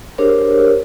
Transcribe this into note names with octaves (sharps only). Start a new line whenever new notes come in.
D4 G4 G#4 A#4 C5 C#5